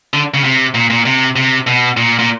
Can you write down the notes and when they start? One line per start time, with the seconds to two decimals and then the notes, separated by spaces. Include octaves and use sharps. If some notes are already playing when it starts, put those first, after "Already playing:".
0.14 D3
0.34 C#3
0.44 C3
0.74 A#2
0.90 A#2
1.06 C3
1.36 C3
1.67 B2
1.97 A#2
2.19 A#2